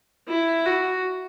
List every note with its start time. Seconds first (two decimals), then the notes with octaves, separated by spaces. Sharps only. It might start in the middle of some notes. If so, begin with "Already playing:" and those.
0.28 E4
0.66 F#4